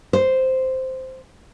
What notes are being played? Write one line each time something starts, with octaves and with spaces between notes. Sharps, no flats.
C5